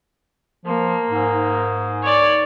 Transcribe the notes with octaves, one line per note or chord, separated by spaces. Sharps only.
F3 A#3
G#2
C#5 D5